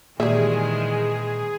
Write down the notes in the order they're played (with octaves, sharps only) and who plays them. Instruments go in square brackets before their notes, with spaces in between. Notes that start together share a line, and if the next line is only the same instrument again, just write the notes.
[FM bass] A#2 [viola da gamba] D#3 E3 G#3 [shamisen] G3 E5 [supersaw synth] G#4